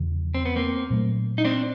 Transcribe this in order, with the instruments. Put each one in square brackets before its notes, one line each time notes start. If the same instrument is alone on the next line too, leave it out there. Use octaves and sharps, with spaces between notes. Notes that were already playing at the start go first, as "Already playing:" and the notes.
Already playing: [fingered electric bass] E2 C#3 F3
[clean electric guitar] C4
B3
A#3 C4
[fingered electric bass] A#2 F#3 A3
[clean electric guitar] D#4
C4 D4